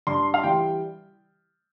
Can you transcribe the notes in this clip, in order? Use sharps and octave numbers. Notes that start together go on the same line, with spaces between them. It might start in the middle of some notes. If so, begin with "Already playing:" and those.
G2 C6
F5
E3 G3 G5